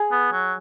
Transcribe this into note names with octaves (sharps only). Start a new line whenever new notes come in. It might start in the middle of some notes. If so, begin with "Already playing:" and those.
Already playing: G#4
B3
F#3